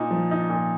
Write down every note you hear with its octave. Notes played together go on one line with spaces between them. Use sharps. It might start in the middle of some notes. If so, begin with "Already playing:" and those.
Already playing: A#2 D#4
F3
D#4
A#2